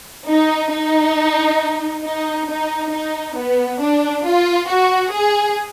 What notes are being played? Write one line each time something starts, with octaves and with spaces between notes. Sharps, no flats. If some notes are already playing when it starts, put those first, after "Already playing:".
D#4
D#4
D#4
D#4
D#4
B3
D4
F4
F#4
G#4